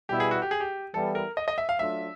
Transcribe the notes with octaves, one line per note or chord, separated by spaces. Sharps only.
B2 G3 B3 E4 G4
G#4
F#4
G4
G#4
G4
E3 G3 B3 E4 A4
A#4
D#5
D#5
E5
F5
F#3 A3 D4 F4 E5